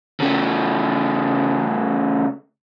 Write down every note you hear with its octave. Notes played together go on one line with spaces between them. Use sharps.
C#3 A3